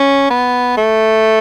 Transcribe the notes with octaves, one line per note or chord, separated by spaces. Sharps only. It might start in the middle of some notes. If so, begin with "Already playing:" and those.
Already playing: C#4
B3
A3